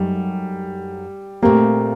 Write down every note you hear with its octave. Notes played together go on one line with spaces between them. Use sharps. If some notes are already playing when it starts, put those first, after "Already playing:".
Already playing: F#2 F#3 G3 A3 D#4
A#2 A3 A#3 C4 G4